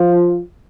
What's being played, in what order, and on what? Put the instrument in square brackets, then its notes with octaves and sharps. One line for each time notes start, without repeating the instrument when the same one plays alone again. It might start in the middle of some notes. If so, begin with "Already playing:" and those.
Already playing: [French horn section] F3 F4